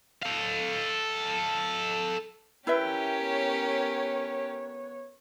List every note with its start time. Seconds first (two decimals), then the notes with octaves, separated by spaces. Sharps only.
0.22 A4 F5
2.67 C#4 E4 G4 A#4 B4 E5 G5
3.18 B3 C#5